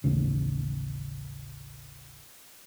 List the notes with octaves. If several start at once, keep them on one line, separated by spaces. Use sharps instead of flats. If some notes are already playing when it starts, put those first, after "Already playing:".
A1 D#2 C#3